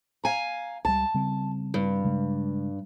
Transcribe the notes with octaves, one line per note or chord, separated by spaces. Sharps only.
F5 G#5 A#5
C#2 G3 A5
C#3 G3 C4
G2
C#3 G#3